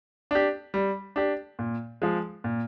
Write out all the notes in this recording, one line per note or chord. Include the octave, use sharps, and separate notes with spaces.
D4 G4
G3
D4 G4
A#2
F3 G#3
A#2